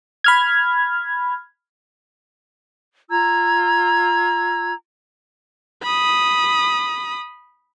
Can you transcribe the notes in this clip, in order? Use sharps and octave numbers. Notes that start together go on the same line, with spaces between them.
B5 F6 G#6
F4 A#5 E6 G#6
B5 D#6